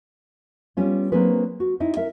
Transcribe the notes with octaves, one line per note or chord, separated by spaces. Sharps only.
G3 B3 C#4 F4
F#3 A#3 C4 D4 G#4 B4
F#4
C4 D#4 E4
A#4 E5